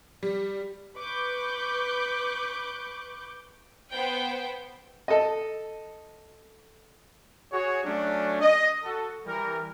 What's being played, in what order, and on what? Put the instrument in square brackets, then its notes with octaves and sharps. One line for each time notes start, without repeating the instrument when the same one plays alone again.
[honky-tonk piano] G3
[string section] B4 C#6 D6 F#6 G6
[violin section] B3 C5 G5
[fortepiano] A4 D#5
[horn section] F#4 G#4 C#5
F#3 A3 C#4 D4
D#5
F#4 A4
E3 G3 A#4